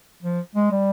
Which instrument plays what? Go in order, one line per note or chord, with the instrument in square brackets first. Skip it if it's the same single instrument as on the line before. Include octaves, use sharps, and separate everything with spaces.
[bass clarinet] F3
G#3
G3